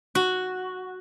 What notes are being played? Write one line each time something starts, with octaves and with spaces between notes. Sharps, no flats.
F#4